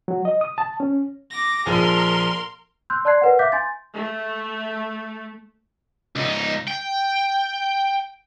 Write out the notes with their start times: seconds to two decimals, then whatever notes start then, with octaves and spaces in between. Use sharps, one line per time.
0.08 F#3
0.25 D#5
0.41 D#6
0.58 A5
0.80 C#4
1.31 D6 A#6
1.66 A#1 F3 G#4 A#4 C6
2.90 C6 E6 F#6 G6
3.05 D5 A5 C6 F#6 G#6 C7
3.21 A#4 B4 C#5 F#5
3.39 E5 F5 D6 F#6 G6 B6
3.52 G#5 C6 G6 A6
3.95 A3
6.16 C#2 D#4
6.68 G5